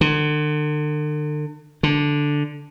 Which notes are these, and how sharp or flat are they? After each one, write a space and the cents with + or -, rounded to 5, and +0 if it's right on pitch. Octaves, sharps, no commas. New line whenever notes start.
D3 +40
D3 +0